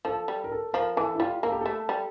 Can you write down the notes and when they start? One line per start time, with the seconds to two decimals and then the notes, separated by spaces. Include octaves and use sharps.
0.05 F3 A4
0.28 G3
0.44 A#4
0.52 A4
0.73 F3 A#4
0.97 E3 A4
1.15 E4
1.19 G3 F4
1.43 A#3 A4
1.52 G4
1.61 A3 A4
1.89 G3